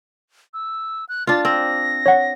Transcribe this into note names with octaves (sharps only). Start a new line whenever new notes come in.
E6
F#6
D4 F4 A6
C4 A#6
C#5 F#5